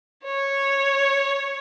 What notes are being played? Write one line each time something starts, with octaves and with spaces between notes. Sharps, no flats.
C#5